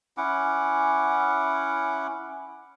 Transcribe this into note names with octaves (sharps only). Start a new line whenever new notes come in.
C#4 E4 F#5 D6